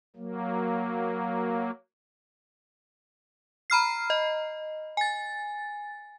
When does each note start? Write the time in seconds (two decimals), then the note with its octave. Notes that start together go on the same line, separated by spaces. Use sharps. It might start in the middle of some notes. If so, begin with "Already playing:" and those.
0.16 F#3 A#3
3.70 A#5 B5 F6 C7
4.10 D#5
4.97 G#5 A6